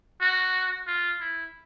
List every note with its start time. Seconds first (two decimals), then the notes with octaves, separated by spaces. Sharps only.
0.21 F#4
0.87 F4
1.21 E4